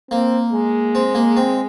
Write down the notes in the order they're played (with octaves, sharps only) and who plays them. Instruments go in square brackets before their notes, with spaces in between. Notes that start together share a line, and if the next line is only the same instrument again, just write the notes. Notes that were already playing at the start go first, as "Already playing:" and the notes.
[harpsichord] A#3 [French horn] C4
[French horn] G#3
[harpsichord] C4
A#3
C4